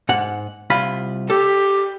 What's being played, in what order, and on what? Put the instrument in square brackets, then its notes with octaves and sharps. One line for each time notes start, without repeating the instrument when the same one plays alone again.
[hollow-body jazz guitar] G#2 F#5
C2 F4 B5
[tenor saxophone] G4 [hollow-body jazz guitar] A4